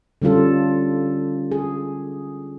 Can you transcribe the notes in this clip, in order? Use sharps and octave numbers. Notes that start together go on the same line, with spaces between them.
D3 G3 C#4 F4 A4
G#4